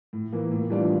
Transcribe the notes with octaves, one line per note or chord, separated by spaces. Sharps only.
A2
E3 A#3
A2
E3 G3 D4 F4